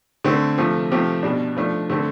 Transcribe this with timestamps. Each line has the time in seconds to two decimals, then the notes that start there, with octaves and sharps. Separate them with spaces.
0.24 D3 A3 C4
0.58 C3 F3 A3
0.91 C3 F3 A3 C4 G4
1.23 B2 G3 D4
1.57 F3 A3 D4
1.90 D3 A3 C4